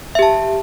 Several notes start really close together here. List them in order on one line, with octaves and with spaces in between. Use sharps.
E5 G4 A5